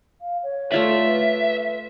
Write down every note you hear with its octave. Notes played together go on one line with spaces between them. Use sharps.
F5
C#5
A3 F4 D5 E5
B4